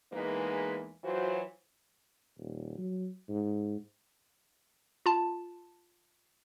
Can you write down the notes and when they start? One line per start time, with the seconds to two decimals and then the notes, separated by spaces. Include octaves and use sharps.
0.12 E2 E3 G#3 A#3 D#4 B4
1.03 E3 F#3 F4 F#4 C5
2.38 D#1
2.78 F#3
3.29 G#2
5.06 F4 A5